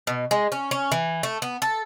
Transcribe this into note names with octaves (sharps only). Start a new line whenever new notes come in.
B2
G#3
C#4
C#4
E3
A3
B3
A4